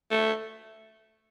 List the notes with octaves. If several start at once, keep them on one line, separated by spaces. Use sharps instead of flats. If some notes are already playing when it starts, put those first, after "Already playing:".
A3